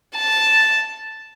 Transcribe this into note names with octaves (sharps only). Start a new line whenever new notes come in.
A5